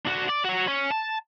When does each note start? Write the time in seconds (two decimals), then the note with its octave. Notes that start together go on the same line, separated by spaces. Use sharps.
0.07 D4 F#4
0.29 D5
0.45 F#4 C#5
0.68 C#4
0.91 A5